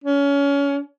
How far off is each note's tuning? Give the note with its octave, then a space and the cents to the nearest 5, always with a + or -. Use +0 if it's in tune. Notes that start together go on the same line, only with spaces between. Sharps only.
C#4 +25